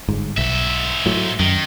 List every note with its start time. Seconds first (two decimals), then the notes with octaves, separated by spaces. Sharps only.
0.08 G1 G#2
0.38 B1 G#2 E5
1.06 A2 F#3
1.40 F#2 D#3